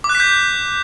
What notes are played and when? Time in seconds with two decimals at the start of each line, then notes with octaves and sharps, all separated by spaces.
0.04 D6
0.09 F#6
0.15 B6
0.20 G6